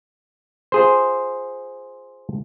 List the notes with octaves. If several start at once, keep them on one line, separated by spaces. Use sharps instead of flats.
F4 G#4 C5